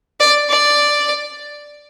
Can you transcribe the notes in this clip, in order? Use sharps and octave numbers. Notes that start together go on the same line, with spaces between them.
D5
D5